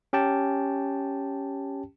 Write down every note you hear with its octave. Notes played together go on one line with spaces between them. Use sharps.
C#4 G4 G5 A5